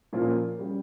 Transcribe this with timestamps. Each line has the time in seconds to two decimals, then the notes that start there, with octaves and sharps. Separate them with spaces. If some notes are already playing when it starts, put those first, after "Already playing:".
0.13 A#2 F3 A#3 C#4 F4
0.59 G3 C#4 G4